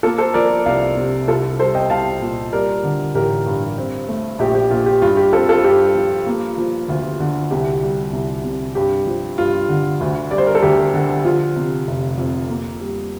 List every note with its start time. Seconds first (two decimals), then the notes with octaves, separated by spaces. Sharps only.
0.03 A#3 F4 A4
0.18 A4 C5
0.34 F3 A#4 D5
0.66 C2 D5 F5
0.97 C3
1.28 C2 F4 A4
1.59 G3 A4 C5
1.75 D#5 G5
1.90 C2 F5 A5
2.21 A#2
2.53 G3 A#4 D5
2.84 D3
3.14 A1 G4 A#4
3.46 G2
3.78 C4
4.08 A3
4.39 A#1 G4
4.55 G4
4.71 A#2 F4
4.86 G4
5.02 G2 F4
5.17 G4
5.33 C4 F4 A4
5.49 F4 A4
5.64 G2 G4
5.95 F3
6.27 A#3
6.58 F3
6.89 D2 F4
7.20 D3
7.51 C2 G4
7.83 G3
8.13 C2
8.44 C3
8.75 G2 G4
9.07 F3
9.38 G2 F4
9.69 D3
10.01 D2
10.31 G3 D5
10.38 C5
10.47 A#4
10.55 A4
10.62 D2 G4
10.94 D3
11.25 F3 F4
11.56 C3
11.87 F1
12.18 F2
12.49 A#3
12.81 G3